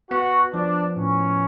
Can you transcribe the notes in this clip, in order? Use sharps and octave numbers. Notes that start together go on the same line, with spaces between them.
B3 F#4
F3 D4
A2 C#4